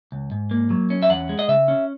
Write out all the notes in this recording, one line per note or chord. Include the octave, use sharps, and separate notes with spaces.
C#2
G#2
A#3
F#3
C#4
E5
E2 F#5
G#3
D#5
C#3 E5
C#4